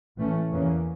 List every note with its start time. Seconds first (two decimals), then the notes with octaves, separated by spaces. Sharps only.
0.17 A2 E3 A3 C#4
0.52 E2 C#3 E3 A#3 C#4